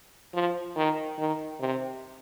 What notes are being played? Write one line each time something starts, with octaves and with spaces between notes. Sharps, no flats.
F3
D#3
D#3
C3